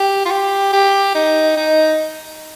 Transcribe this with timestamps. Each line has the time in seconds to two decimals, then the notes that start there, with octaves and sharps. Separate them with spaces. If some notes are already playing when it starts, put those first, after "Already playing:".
Already playing: G4
0.26 F4
0.31 G4
0.73 G4
1.15 D#4
1.57 D#4